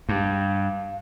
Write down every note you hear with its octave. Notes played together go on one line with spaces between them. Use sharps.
G2 F5